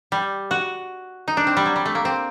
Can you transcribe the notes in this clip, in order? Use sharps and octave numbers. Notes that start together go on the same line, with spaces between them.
G3
F#4
D#4
D4
C4
G3
F#3
G3
A3
A#3
C4